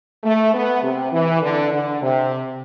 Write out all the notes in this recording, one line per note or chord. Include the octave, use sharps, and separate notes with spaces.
A3
B3
C3
E3
D3
D3
C3